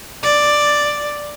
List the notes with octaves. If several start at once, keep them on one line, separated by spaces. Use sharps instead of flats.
D5